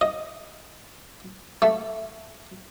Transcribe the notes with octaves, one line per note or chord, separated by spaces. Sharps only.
D#5
A3